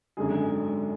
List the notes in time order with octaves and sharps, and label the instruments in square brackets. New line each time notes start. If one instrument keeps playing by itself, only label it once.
[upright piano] G#1 F#2 D3 G#3 G#4